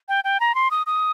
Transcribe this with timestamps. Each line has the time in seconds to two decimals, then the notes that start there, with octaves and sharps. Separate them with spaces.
0.09 G5
0.24 G5
0.40 A#5
0.55 C6
0.71 D#6
0.87 D#6